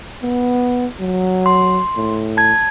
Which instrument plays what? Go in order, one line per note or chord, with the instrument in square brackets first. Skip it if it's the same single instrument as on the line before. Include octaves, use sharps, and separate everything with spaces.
[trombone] B3
F#3
[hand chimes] C6
[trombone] A2
[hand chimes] A5 G#6